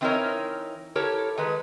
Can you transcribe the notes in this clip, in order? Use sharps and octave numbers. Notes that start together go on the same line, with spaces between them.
E3 C4 D#4 E4 A#4 C#5
E4 G4 A4 A#4 C#5
D#3 G#3 B4